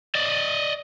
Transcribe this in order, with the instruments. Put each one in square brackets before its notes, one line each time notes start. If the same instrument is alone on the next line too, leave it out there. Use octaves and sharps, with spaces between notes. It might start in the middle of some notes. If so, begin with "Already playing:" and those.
[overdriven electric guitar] D5 D#5